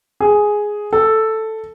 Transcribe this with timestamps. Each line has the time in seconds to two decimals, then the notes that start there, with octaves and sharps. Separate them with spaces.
0.20 G#4
0.93 A4